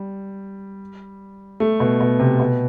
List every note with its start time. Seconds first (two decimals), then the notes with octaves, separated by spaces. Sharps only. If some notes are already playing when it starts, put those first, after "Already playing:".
Already playing: G3
1.60 A3
1.80 B2
2.00 B2
2.20 C3
2.40 B2